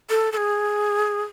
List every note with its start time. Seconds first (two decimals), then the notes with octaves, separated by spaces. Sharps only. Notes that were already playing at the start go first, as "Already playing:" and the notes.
0.10 A4
0.32 A4
0.37 G#4